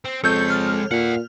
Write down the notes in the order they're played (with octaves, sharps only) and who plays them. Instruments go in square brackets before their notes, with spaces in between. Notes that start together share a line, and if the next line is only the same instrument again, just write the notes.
[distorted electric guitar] C4
[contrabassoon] F2 [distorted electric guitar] G#3 C#5 [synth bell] A4 G6
[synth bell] F6
[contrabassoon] A#2 [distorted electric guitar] E5 F#5